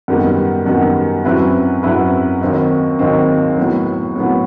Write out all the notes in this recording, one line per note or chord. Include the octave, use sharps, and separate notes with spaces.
F#2 D#3 G3 B3
F#2 D#3 G3 B3
F#2 F#3 C4 E4 B4
F#2 F#3 C4 E4 B4
D#2 D#3 F#3 C4 D#4
D#2 D#3 F#3 C4 D#4
A2 F#3 B3
A2 F#3 B3